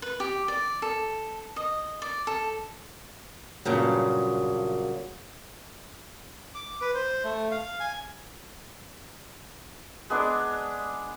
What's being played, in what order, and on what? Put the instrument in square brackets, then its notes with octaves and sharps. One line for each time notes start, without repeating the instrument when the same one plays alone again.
[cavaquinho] B4
G4
D5
A4
D#5
D5
A4
[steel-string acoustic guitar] G2 A#2 C#3 F#3
[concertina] D6
B4
C5
A3
F5
G#5
[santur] G#3 B3 D4